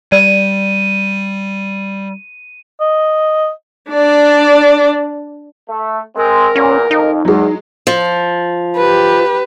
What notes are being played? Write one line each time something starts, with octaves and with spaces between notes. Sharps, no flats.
G3 D5 D#7
D#5
D4 D5
A3
G#3 C4 A#4
E2 A#2 C#4
F2 D#4
E2 F#3 G#3
F3
G4 B4